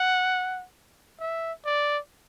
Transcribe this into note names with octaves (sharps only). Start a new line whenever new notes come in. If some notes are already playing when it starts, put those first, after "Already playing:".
Already playing: F#5
E5
D5